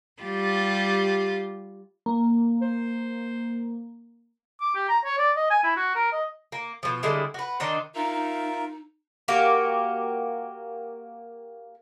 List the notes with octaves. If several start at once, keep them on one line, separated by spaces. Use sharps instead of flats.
G3 F4 G4
A#3
C5
D6
G4
A#5
C#5
D5
D#5
G#5
E4
F#4
A#4
D#5
A#3
B2 F3
D3 G3 G#3 E4
F#4 B4
D#3 D4 D#4 C5
D#4 F4 A#4 E5
A#3 F#4 G4